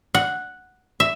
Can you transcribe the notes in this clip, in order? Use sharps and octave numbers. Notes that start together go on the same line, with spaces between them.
F#5
E5